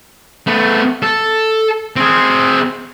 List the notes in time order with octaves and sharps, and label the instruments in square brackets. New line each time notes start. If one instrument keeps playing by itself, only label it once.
[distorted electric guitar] A3 B3
A4
C4 G#4